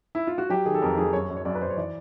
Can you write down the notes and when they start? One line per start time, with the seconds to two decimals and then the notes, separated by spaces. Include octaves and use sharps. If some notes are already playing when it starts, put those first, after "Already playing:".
0.15 E4
0.27 F4
0.38 F#4
0.49 F#3 G4
0.66 D#3 G#4
0.75 A4
0.82 F2 A#4
0.98 F#3 G#4
1.13 F#2 C#5
1.30 F#2
1.37 C#5
1.45 F#2 D5
1.55 B4
1.62 F#2 C5
1.70 C#5
1.77 E3 D5